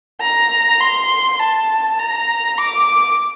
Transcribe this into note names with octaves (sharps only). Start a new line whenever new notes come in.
A#5
C6
A5
A#5
D6